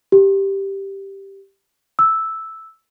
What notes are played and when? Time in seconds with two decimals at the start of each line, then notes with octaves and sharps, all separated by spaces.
0.12 G4
1.99 E6